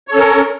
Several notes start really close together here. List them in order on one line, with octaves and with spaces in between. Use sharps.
C#5 A4 C#4 A#4